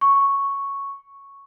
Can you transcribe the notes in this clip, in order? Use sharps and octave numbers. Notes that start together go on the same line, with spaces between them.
C#6